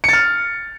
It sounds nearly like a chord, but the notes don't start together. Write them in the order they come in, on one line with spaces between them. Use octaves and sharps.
C#7 A6 F6